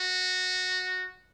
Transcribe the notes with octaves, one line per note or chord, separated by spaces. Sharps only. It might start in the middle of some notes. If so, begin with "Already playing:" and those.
Already playing: F#4